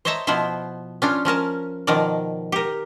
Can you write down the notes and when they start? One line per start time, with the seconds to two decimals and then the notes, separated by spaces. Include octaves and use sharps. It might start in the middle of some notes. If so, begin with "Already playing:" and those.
0.05 C5 C#5 D#5 E5 A5 A#5
0.27 B2 F3 B3 E4 C5
1.02 C#4 D4 F4
1.25 F3 C#4 A#4 A5
1.87 B2 D#3 F3 A#4 D5
2.52 G4 A#4